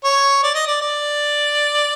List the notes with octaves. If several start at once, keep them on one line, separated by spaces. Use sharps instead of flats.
C#5
D5
D#5
D5
D5